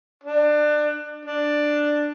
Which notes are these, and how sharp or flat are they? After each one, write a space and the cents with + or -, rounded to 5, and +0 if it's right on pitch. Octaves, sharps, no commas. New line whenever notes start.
D4 +25
D4 +5